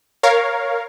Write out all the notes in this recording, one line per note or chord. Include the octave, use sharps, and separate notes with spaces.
A#4 C#5 F5